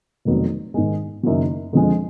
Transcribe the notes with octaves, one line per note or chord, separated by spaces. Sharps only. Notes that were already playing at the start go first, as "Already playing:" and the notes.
F1 F2 D#3 F#3 B3
G#2 D#3 G#3
F#1 F#2 D#3 F#3
F2 D3 F3 G#3